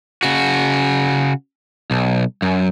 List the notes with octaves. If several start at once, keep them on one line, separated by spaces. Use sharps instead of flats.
C#3 F#4
B1
F#2